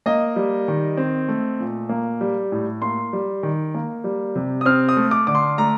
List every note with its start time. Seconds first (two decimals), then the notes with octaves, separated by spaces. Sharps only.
0.06 A#3 D#5
0.36 G3
0.68 D#3
0.97 C4
1.28 A3
1.60 A#2
1.89 A#3
2.21 G3
2.52 A2
2.82 A#3 C6
3.13 G3
3.43 D#3
3.74 A#3
4.04 G3
4.36 C3
4.61 D#6
4.65 C4 F6
4.89 D#6
4.97 A3
5.11 D6
5.27 D3 D6
5.35 C6
5.58 A3 A#5